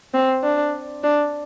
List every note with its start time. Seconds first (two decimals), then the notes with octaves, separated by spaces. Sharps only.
0.14 C4
0.44 D4
1.04 D4